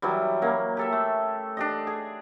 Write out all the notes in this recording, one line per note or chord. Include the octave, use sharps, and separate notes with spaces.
E3 F#3 G3
F#3 A#3 C#4
G4 A4 E5
A3
D4 G4 D#5
G#4